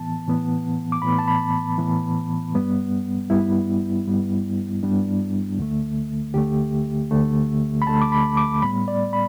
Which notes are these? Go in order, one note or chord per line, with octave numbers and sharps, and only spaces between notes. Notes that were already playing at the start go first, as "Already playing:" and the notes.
Already playing: A2 E3 B3 A5
A2 E3 B3
D6
A2 E3 B3 B5
A5
B5
A2 E3 B3
G2 G3 B3
G2 G3 B3 E4
G2 G3 B3
G2 G3 B3 D4
D2 D3 A3
D2 D3 A3 G4
D2 D3 A3
B5
D2 D3 A3 A5
D6
B5
D6
A2 G3 B3 B5
D5
B5